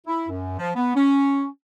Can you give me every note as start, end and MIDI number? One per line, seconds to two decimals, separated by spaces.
0.07 0.25 64
0.29 0.57 42
0.58 0.70 53
0.76 0.95 59
0.95 1.46 61